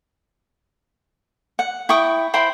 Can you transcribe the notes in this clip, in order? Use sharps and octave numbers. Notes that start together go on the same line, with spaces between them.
F#5
E4 G5 C#6 D#6
E4 C5 G5 B5